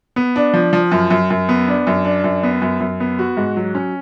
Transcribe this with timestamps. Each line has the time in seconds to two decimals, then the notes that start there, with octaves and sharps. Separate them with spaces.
0.16 B3
0.36 D4
0.54 F3
0.73 F3
0.92 F#2
1.10 F#2
1.30 F#2
1.49 B3
1.68 D4
1.87 F#2
2.05 D4
2.24 F#2
2.43 B3
2.62 F#2
2.80 F#2
3.00 B3
3.19 F#4
3.37 G#2
3.57 F#3
3.75 C#4